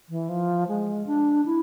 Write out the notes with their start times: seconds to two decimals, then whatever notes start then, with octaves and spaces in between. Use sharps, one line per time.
0.09 E3
0.29 F3
0.68 G#3
1.06 D4
1.46 E4